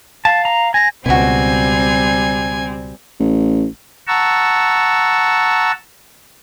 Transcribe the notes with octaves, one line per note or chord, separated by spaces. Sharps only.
F5 A5
A#5
G#5 A#6
C#2 B2 G3 C4 E4 F#4 G#5
A1
F#5 A5 A#5 C#6 E6